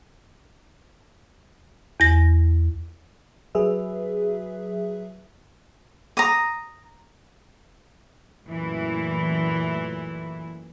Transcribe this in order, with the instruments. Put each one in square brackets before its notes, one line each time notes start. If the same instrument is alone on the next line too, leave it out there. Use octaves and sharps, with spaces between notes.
[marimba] E2 A#6
[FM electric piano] F#3 G#4 B4 E5
[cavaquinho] A#5 D#6
[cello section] F#2 A#2 E3 A3 E4